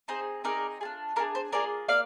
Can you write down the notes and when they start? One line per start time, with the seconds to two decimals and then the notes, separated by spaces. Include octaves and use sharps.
0.08 C4 D#4 G#4 C5
0.44 C4 D#4 G#4 A#4 D5
0.81 D4 F4 G#4
1.16 D4 F4 G#4 A#4
1.35 C5
1.53 A#3 F4 G#4 A#4 D5
1.89 A#3 D5 F5